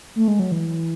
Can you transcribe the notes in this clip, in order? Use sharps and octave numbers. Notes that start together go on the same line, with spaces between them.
A3
G#3
F#3
E3